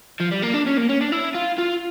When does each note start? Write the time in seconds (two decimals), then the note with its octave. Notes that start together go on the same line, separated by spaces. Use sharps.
0.20 F3
0.31 G3
0.42 A#3
0.53 D4
0.66 C#4
0.77 A#3
0.89 C#4
1.01 D4
1.12 E4
1.35 F4
1.58 F4